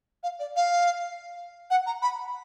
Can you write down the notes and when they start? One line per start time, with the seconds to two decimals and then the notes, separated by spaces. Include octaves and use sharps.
0.23 F5
0.39 D5
0.56 F5
1.70 F#5
1.86 A#5
2.02 B5